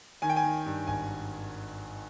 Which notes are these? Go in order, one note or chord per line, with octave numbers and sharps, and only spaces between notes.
D#3 G#5
G5
G#5
D#3
G2
G#1 G#5